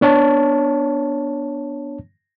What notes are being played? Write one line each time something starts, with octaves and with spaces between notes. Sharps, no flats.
B3 D4 C#5 A5